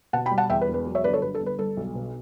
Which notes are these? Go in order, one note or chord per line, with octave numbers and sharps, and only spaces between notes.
B2 F#5 A5
G5 B5
G3
F#5 A5
E2 E5 G5
B4
E1
B4
F#3
C#5 E5
G1 B4 D5
A4 C#5
G2 B4
A4
G1
B4
G3 A4
B1
B2